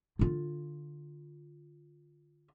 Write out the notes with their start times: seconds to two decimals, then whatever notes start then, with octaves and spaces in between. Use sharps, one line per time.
0.19 D3 F4